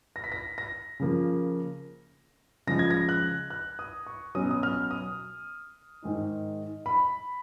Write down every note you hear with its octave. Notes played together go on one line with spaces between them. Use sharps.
A#6
B6
A#6
A#6
C#3 F3 A#3
C#3 F3 G#3 A#6
G#6
A#6
F#6
F#6
D#6
C#6
B2 F#3 C#4 D#6
D#6
F6
D#6
G#2 D#3 G#3 D#4
B5